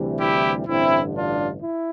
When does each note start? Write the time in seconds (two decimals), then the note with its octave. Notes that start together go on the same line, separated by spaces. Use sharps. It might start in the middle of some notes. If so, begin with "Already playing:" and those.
Already playing: D2 C3 E3 G3
0.19 E4 G4
0.67 A1 G2 D3 C4 E4
1.15 D4 F4
1.62 E4